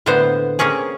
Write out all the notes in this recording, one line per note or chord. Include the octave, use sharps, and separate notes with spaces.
A2 D3 A#3 B3 C5
A#3 C4 C#4 G#4